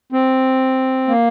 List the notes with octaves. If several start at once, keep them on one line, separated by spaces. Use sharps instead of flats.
C4
A#3